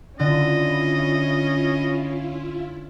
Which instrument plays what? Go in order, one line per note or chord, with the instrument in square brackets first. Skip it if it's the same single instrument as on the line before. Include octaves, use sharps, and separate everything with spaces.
[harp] D3 [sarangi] C#4 [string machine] E4 F4 [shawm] D#5